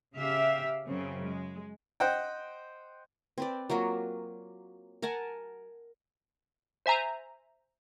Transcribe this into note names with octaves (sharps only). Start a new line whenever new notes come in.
C#3 G4 E5 F5
F#2 C#3 C4
G#3
C5 D#5 F#5 G5
C4 B4 D5
F#3 A#3 F4 F#4
A#4 F#5 G#5 A5
C5 E5 G#5 A#5